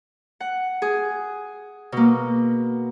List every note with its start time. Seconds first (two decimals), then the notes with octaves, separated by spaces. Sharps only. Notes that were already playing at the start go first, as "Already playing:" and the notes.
0.40 F#5
0.82 G#4
1.92 B2 A#3